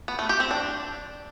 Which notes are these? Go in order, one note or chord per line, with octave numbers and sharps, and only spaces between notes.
B3
A3
G4
C4
D4